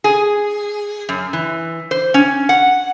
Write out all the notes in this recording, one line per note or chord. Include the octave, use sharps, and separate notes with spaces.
G#4
F#2
E3
C5
C#4
F#5